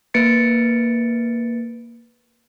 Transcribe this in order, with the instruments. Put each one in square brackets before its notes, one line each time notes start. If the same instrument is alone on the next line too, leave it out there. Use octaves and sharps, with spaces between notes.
[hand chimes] A#3 B4 A6 C#7 D7